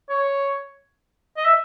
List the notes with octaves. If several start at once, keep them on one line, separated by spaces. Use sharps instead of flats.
C#5
D#5
E5